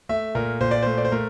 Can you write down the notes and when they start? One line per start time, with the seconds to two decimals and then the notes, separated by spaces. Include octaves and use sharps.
0.09 A3 E5
0.35 A#2 A#4
0.61 A#2 C5
0.71 D5
0.83 A3 C5
0.98 D5
1.05 C5
1.12 A3 A#4